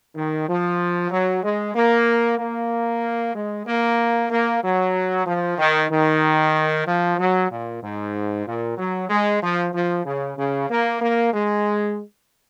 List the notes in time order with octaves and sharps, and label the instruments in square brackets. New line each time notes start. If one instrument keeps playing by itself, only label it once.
[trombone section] D#3
F3
F#3
G#3
A#3
A#3
G#3
A#3
A#3
F#3
F3
D#3
D#3
F3
F#3
A#2
G#2
A#2
F#3
G#3
F3
F3
C#3
C#3
A#3
A#3
G#3